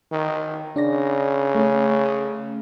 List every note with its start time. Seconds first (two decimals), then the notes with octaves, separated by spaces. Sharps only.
0.12 D#3
0.76 C#3 D4 D5 A#6
1.55 A3 C#4